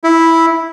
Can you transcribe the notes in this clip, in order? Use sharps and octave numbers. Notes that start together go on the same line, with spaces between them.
E4